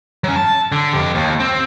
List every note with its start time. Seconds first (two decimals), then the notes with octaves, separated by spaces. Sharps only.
0.24 F#3 C#4
0.36 A5
0.72 D3
0.93 F2 G4
1.15 D#2
1.40 C4